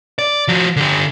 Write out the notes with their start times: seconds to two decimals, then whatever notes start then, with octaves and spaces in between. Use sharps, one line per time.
0.19 D5
0.49 F3 F#4
0.77 D3 G4